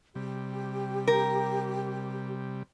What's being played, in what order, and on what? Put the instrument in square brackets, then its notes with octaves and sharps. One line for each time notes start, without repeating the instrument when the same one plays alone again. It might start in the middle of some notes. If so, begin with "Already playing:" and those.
[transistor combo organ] C3 G3 [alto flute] G4
[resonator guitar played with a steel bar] A#4